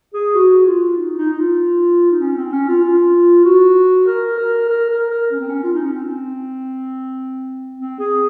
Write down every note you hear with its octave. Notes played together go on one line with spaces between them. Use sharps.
G#4
F#4
F4
D#4
D#4
D#4
F4
D#4
C#4
C4
C#4
F4
F4
F#4
A#4
A#4
A#4
A#4
A#4
C#4
C4
C#4
F4
D#4
C#4
C4
C4
G#4